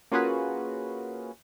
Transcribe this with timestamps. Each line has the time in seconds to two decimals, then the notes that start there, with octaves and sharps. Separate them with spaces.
0.12 A#3 C#4 F4 F#4 G#4 B4